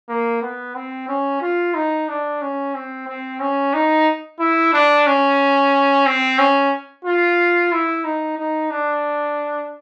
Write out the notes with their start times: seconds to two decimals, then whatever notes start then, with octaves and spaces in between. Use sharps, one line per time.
0.09 A#3
0.42 B3
0.75 C4
1.09 C#4
1.41 F4
1.75 D#4
2.08 D4
2.42 C#4
2.75 C4
3.08 C4
3.40 C#4
3.74 D#4
4.39 E4
4.73 D4
5.07 C#4
6.06 C4
6.38 C#4
7.05 F4
7.72 E4
8.05 D#4
8.38 D#4
8.71 D4